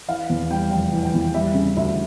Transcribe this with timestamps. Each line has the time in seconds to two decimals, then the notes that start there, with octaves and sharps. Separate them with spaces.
0.08 E3 F5
0.30 E2
0.51 G3 G5
0.71 F1 G5
0.93 E3
1.03 G5
1.14 E2
1.34 G3 E5
1.55 C#3
1.77 D2 E5